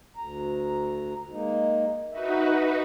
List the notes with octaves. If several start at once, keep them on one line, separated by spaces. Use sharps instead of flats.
D2 A#5
G#3 A#3 D#4
D#4 F#4 B4 E5